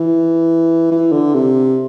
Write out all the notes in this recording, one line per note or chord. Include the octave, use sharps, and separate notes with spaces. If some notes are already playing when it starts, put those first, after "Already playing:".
Already playing: E3
E3
D3
C3